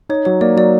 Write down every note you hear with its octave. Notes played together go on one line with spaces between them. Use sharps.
D#4 C#5
F#3 C#5
A#3 D5
F#3 D5